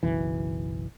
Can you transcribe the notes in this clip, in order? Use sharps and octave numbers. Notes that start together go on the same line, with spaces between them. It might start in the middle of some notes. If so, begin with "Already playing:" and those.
F#1 B1 E3